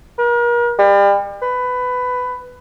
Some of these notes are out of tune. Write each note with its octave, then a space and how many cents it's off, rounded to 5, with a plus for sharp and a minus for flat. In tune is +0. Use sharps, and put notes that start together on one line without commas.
A#4 +40
G3 +35
B4 +15